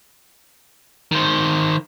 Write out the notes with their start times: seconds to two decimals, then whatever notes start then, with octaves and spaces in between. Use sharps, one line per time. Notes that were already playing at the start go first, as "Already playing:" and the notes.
1.11 D#3 C5